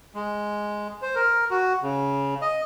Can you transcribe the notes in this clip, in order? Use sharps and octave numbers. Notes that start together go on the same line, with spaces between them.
G#3
C5
A#4
F#4
C#3
D#5